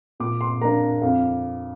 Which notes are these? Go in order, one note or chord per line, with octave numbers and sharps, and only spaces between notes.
A#2 D6
C6
A#3 D4 A#5
F2 F5